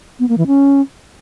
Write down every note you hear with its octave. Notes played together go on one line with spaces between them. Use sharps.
B3
A#3
E3
C#4